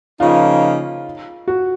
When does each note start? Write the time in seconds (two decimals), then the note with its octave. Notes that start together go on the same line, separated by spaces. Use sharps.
0.20 C#3 F3 A#3 D#4 F4
1.48 F#4